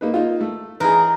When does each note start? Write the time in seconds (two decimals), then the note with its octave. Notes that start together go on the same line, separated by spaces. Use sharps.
0.01 A#3 D#4 B4
0.14 A#3 D#4 F4
0.41 A3
0.80 E3 D#4 G#4 A#4 B4